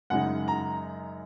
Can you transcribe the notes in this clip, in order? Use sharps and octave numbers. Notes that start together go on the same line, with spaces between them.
F#2 C#3 G#3 D#4 F#5
A#5